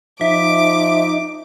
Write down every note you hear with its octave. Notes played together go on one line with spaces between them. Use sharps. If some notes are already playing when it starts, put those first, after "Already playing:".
F3 D#4 E5 D6